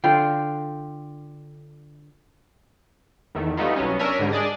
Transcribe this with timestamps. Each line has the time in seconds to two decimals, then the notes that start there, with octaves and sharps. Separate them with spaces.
0.04 D3 F4 G5
3.35 E2 D#3 A3
3.57 G3 A3 B3 D#4 F4
3.76 C2 F#3 B3 C#4
3.99 C#4 D4 A#4 C#5 E5 G#5
4.19 G#2 D3 G3
4.32 D4 G#4 D5 D#5